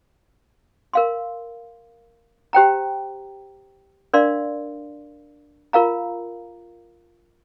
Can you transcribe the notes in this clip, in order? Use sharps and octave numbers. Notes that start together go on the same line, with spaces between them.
A#4 F5 C6
G4 C5 G5 A#5
D4 A#4 D5 F5 C6
F4 A#4 F5 A#5